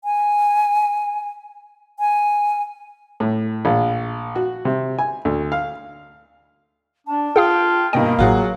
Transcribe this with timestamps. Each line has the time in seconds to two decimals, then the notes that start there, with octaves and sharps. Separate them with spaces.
0.04 G#5
1.99 G#5
3.20 A2
3.65 A#1
4.36 F#4
4.65 C3
4.98 G#5
5.25 D2
5.52 F5
7.07 D4 A5
7.36 F4 G#4 F5 G5 D#6
7.93 G2 B2 A#3 D#5 G5
8.19 A1 A2 F#3 F4 F#4 G#4